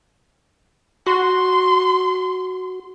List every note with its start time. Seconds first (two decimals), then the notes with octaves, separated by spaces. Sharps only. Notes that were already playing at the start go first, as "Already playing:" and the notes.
1.07 F#4 C6